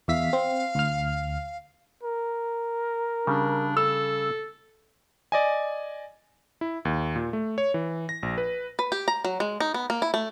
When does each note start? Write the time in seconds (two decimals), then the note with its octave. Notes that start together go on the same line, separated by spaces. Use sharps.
0.08 E2 E5 F5 B6
0.33 C4
0.75 D2 F6
2.03 A#4
3.27 C#3 G3 D4
3.77 A4 E6
5.32 D5 D#5 G#5
6.61 E4
6.85 D#2
7.16 A#2
7.33 A3
7.58 C#5
7.74 E3
8.09 A#6
8.23 A#1
8.38 B4
8.79 B4
8.92 G4
9.08 A#5
9.25 F#3
9.40 G#3
9.60 D#4
9.74 B3
9.90 A#3
10.02 E4
10.14 A3